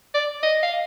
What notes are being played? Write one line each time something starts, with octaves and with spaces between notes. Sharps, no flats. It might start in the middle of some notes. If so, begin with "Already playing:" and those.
D5
D#5
F5